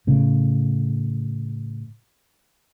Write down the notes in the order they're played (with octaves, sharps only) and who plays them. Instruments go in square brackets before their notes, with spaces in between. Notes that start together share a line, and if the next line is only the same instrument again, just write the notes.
[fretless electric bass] A2 C#3